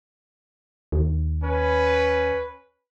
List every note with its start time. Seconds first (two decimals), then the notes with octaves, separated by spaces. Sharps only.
0.92 D#2
1.43 C#4 B4